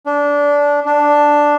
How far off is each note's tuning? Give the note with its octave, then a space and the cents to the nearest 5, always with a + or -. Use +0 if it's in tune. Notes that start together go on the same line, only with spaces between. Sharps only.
D4 -20
D4 +0